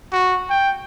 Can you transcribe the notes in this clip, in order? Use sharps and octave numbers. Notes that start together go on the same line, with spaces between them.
F#4
G5